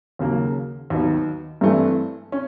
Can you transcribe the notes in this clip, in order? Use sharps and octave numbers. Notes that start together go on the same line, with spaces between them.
D#2 C#3 F#3 A#3
D#2 D#3 F#3 B3 D#4
G2 E3 A3 C4
C#4